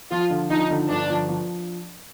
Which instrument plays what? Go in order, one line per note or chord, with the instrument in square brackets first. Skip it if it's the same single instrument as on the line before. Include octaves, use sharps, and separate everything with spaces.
[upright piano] F3 [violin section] F4
[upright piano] D3
[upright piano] F3 [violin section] D#4
[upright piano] D3
[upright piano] G1 [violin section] D4
[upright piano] F3
F3